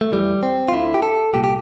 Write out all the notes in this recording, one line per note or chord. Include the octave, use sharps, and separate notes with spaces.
A3
F2 E3 G3
C4
F4
D2 D3 E4
G4
A4
C2 A#2 G4
G4